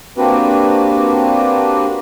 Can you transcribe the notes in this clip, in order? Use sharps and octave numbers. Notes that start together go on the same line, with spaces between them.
A#3 C4 D4 F#4 G4 B4